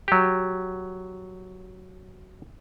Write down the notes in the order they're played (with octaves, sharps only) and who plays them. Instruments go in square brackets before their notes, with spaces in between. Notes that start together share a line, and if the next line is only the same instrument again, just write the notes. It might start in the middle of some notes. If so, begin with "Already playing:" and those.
[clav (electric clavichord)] F#3 G4